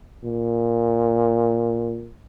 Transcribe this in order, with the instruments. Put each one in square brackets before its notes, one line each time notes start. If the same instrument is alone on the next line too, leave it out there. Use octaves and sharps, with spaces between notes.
[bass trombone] A#2